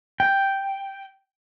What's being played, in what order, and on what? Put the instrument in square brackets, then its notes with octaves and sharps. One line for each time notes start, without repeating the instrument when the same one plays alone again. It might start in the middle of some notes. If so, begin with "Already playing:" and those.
[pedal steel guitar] G5